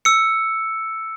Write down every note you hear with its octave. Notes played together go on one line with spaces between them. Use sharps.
E6 C#7